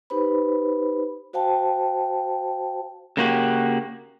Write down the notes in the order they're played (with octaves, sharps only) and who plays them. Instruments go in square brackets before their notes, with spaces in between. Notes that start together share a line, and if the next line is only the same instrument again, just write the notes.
[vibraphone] D#4 G4 B4 C5 B5
F#4 C5 F5 G5 A5
[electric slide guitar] C#3 A#3 F#4 G4